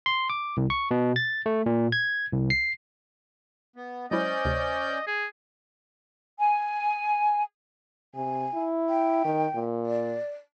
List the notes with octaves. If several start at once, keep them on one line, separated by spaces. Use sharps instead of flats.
C6
D6
C2
C#6
B2
A6
A3
A#2
G#6
C2
C7
B3
F#3 G#3 C#4 E4 C5 D5 D#5 G6
D2 C3
G#4
G#5
C3 G#5
E4
G5
D#3
A#2
D5